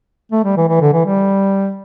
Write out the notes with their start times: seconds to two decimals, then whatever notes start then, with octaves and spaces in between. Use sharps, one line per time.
0.32 A3
0.44 G3
0.57 E3
0.69 E3
0.81 D3
0.93 E3
1.06 G3